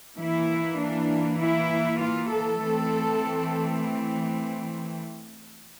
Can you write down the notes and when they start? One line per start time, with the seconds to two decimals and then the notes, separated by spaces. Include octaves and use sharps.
0.18 E3 A#3 E4
0.79 D4
1.39 E4
1.99 F4
2.29 A4
2.60 E3 A3 C4